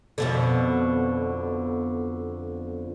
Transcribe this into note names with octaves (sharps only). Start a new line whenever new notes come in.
F2 B2 D3